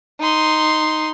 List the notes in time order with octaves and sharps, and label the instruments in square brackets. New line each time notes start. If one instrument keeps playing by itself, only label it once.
[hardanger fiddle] D#4 C6